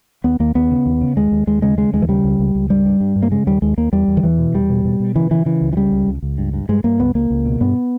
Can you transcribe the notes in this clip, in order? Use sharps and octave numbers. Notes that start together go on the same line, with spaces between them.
D#2 B3
D#2 A#3
D#2 B3
C#3
D#2
C#3
D#2 G#3
D#2
D#2 G#3
C#3 G#3
C#3 G#3
D#2 G#3
E3
C#3 G3
C#2
C#2
C#2
G2 G3
G2
G2
G2
A#3
C#3 G#3
D#2 G3
D#2 G#3
D#2 A#3
E2 G3
E2
D#3
E2 E3
B2
E2 G3
B2
B2
B2
C#3 E3
C#3 E3
C#3 E3
C#2
E3
C#3 G3
C#2
C#2
C#2
G2
G2
G2 G#3
G2 A#3
C#2 B3
C#2 A#3
C#2
B2
G2 B3